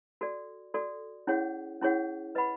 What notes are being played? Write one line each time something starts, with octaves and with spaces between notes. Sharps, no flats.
F#4 A4 D5
F#4 A4 D5
C#4 E4 G#4 C#5 F#5
C#4 E4 G#4 C#5 F#5
B4 D#5 F#5 B5